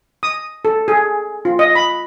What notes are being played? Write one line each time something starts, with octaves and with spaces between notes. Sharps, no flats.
D#6
A4
G#4
F4
D#5
B5